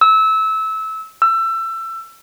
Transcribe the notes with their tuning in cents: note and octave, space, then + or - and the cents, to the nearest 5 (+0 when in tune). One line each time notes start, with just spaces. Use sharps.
E6 -20
E6 +25